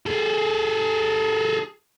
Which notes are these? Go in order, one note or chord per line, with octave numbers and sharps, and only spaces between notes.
G#4 A4